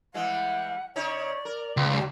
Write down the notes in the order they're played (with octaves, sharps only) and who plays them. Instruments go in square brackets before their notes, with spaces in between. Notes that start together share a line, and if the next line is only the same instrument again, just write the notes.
[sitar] E3 G3 G#3 [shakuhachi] F#5
[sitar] C#3 D#4 C#5 [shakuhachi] D5
[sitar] A#4
[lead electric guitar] C#2 [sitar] B3
[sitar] G#2 F#3